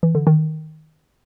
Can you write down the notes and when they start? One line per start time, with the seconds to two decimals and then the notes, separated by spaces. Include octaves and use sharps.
0.03 E3
0.15 D3
0.27 D#3